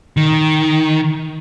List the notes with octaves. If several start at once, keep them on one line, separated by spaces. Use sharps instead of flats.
D#3